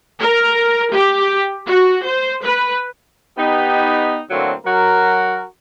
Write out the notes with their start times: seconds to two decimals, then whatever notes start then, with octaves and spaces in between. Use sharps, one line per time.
0.20 A#4
0.92 G4
1.67 F#4
2.04 C5
2.44 B4
3.38 B3 D#4 G4
4.30 A2 D3 F#3 A#3 C4 F#4
4.65 F#3 F#4 A#4